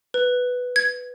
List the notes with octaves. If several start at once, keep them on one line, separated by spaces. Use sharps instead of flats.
B4
G#6